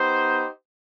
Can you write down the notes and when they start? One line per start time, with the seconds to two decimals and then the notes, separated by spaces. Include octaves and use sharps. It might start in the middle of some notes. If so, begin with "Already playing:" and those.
Already playing: B3 D#4 G4 C5